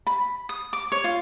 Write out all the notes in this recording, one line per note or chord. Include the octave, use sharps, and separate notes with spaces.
B5
D#6
D6
C#5
F4